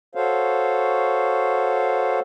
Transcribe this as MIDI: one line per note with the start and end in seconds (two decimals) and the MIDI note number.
0.15 2.20 66
0.15 2.20 69
0.15 2.20 72
0.15 2.20 73
0.15 2.20 77